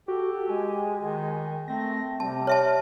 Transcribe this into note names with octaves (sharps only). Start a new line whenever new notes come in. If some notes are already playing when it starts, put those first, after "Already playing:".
F#4 G4 A4
G#3 G#5
D#3
A3 C4 A#6
C3 G3 C4 A5
C#5 E5 A5 F6